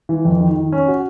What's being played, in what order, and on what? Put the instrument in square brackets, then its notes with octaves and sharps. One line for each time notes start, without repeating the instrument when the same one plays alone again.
[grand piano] E3
F2
D#3
D#3
C#4
F#4